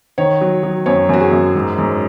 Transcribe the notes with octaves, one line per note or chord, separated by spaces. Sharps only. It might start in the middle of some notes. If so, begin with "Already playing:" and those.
D#3 C#5
F#3
F#3
F#2 C#5
F#2 F#4
G#4
F#2
G#2
G#2